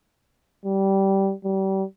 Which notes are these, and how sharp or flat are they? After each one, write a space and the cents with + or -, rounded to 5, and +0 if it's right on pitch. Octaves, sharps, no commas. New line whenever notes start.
G3 -15
G3 -30